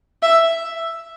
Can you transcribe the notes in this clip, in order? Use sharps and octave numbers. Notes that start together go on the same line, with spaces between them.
E5